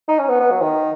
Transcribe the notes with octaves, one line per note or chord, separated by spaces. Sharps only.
D#4
C#4
B3
B3
F#3
D#3